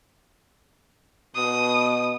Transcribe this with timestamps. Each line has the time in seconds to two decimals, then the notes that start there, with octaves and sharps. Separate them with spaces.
1.36 B2 D#6